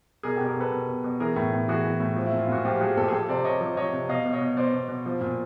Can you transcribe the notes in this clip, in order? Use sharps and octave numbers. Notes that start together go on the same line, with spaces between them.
B2 G#4 A#4
B2 G4 A4
G#4 A#4
B2 A4 B4
B2
B2
B2
E3 G#4 A#4
A2
A2
E3 F#4 G#4
E3
A2
F3
E4
A#2
F4
A#2 F#4
F3 F4 G4
G4
F3 F#4 G#4
A#2 G4 A4
G#4
F3 G4 A4
C3 C5 D5
C3 C#5 D#5
F3
F3 C#5 D#5
C3
B2 D#5 F5
B2
C#5 D#5
B2
B2 C5 D5
B2
B2
F3
A#2